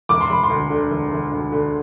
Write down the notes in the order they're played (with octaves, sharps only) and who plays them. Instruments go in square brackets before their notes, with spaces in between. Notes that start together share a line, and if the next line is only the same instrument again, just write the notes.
[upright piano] E1 D6
C6
E1 B5
C6
D2
D3
E1
E1
D2
D3